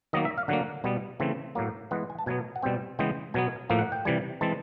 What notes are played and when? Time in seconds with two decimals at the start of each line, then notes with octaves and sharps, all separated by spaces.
0.13 D#3 F#3 A#3 D#5
0.25 E5
0.38 F5
0.48 D3 F#3 A#3 F#5
0.84 B2 G3 B3
1.20 C#3 E3 A3 C4
1.55 A2 F#3 A#3
1.91 E3 G#3 B3 F#5
2.10 G#5
2.19 A5
2.26 B2 F#3 B3 G#5
2.56 F#5
2.62 B2 G3 C4 G5
2.99 C#3 E3 G#3 B3 G5
3.34 B2 F#3 B3 G#5
3.70 A2 F3 A#3
3.79 F#5
3.92 G5
4.05 C3 E3 G3 G#5
4.41 E3 G#3 C4 A5